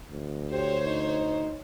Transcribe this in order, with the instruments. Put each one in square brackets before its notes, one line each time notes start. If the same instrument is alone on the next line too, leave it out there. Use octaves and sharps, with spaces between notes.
[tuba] D2
[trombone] G4 [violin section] C5 C#5
[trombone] D#4